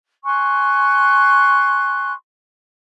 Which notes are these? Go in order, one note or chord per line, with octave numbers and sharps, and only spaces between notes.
G#5 C6 C#6 F#6